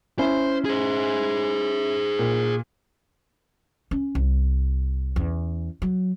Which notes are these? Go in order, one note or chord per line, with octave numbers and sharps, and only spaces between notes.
C#4 E4 C5
G#4 C5
A#2
C#4
C2
E2 C#4
F#3